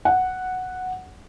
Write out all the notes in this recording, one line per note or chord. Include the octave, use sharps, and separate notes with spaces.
F#5